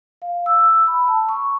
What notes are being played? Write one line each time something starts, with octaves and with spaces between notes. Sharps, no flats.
F5
E6
B5
A5
C#6